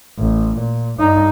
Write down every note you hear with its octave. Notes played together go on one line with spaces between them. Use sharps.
A1
A#2
G2 D#4